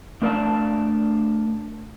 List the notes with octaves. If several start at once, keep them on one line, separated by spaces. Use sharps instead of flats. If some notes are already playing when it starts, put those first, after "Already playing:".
A3 D4 A#4 D5 F5 A5